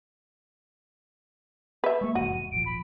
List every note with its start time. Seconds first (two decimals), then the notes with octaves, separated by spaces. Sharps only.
1.84 B4 E5
2.01 G#3 A#3 C#6
2.15 F1 E2 G#2 F#4 D#7
2.52 D#1 G#1 F3 D7
2.66 B5